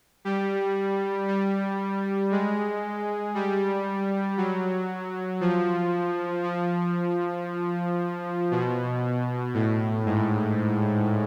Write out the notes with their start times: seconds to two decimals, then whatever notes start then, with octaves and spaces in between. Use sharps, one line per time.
0.25 G3
1.28 G3
2.32 G#3
3.35 G3
4.37 F#3
5.41 F3
6.44 F3
8.51 B2
9.54 A2
10.06 G#2